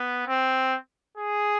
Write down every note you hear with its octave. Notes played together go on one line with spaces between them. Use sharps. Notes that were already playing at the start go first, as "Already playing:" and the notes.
Already playing: B3
C4
G#4